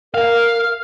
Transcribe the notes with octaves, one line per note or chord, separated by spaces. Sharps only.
A#4 F5